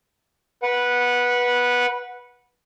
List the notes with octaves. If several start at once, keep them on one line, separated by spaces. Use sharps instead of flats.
B4 F#5